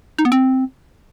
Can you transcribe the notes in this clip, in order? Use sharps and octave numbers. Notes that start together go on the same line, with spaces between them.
D#4
B3
C4